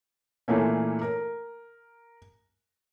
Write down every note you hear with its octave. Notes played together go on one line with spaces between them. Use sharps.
A#2 E3 A3 A#3 C#4
A#4